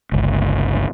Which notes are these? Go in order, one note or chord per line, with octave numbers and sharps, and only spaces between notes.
G1 C#2